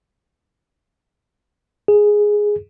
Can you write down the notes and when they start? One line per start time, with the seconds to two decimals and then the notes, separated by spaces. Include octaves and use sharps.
1.88 G#4